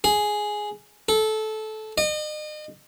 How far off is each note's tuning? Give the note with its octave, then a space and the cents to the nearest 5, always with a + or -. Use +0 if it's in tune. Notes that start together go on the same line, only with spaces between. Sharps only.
G#4 +5
A4 -15
D#5 -35